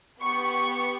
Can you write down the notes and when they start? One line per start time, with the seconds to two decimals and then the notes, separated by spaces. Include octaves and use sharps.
0.21 B3 G4 C#6
0.53 C#6